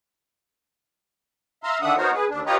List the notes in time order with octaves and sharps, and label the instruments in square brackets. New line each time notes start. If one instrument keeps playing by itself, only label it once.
[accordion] E5 F5 A#5 C6
D3 D#3 D4 E5 F#5 D#6
B3 D#4 F#4 A#4 C5 C#5
G#4 B4
D#2 D4
F4 G4 B4 C#5 D#5 A#5